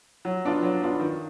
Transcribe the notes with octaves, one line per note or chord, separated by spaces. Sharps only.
F#3
B3 D4 F4
F#3
B3 D4 F4
D#3